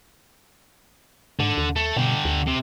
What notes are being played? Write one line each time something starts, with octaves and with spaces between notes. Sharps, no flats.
G#2 D3
D#2
A3
B2 D3 G4
D2
C3